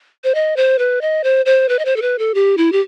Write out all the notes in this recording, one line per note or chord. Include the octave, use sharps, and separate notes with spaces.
C5
D#5
C5
B4
D#5
C5
C5
B4
D#5
C5
A4
B4
A4
G4
E4
G4